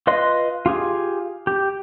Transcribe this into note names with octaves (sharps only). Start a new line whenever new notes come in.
F4 B4 D#5 C6
F4 G4 G#4
G4